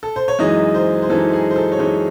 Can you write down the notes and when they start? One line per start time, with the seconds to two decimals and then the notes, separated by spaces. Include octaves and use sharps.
0.03 A4
0.16 C5
0.28 C#5
0.39 F#2 E3 G#3 D#4 D#5
0.74 C5
1.02 C5
1.10 F#2 E3 G#3 D#4 A4
1.33 G#4
1.51 C5
1.56 A4
1.72 C#5
1.79 F#2 E3 G#3 D#4 C5